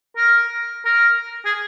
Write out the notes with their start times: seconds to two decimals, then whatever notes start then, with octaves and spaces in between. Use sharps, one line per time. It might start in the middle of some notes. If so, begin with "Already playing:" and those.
0.17 A#4
0.85 A#4
1.45 G#4